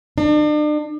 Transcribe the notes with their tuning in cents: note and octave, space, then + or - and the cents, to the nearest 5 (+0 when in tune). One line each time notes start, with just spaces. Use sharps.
D4 +40